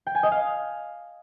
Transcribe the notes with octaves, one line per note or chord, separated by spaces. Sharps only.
G5
G#5
D#5
F5